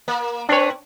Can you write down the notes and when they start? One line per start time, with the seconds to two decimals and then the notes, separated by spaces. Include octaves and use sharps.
0.08 A#3
0.49 C4 D4 B4 C#5